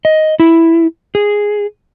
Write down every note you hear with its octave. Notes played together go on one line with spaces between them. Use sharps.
D#5
E4
G#4